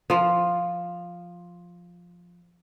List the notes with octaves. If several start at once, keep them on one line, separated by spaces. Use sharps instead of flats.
F3 F4